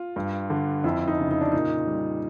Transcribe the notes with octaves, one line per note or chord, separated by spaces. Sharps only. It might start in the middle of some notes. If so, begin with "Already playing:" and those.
Already playing: F4
G2
D3
F2 E4
D#4
C#3
D#4
D4
A#2 D#4
G3